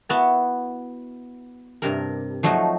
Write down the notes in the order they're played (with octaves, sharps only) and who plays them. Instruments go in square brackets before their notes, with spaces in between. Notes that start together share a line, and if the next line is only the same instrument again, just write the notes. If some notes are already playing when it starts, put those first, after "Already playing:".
[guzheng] B3 E4 F#4 A5
G2 C3 A#4
F3 F#3 A3 D#4 F#4